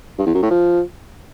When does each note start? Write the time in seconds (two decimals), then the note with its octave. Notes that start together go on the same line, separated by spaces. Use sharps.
0.18 G2
0.26 E2
0.34 F#2
0.43 A2
0.51 F3